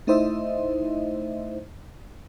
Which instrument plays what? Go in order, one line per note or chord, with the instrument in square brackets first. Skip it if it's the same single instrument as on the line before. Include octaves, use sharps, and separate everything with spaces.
[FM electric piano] A3 D#4 E4 C5 D#5 E5